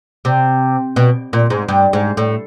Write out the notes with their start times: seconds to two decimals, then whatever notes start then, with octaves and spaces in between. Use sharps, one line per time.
0.25 C3
0.96 B2
1.33 A#2
1.50 G#2
1.68 G2
1.93 G#2
2.17 A2